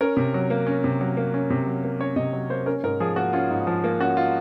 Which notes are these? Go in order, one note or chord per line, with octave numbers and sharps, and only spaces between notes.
C#4 A#4
C3
F#3
A#3
C#4
C3
F#3
A#3
C#4
C3
F#3
A#3
C#4 C#5
C3 D#5
F#3
A#3 C5
C#4 A#4
G#2 A#4
F3 G#4
A#3 F#4
C#4 F4
G#2
F3
A#3
C#4 F#4
F4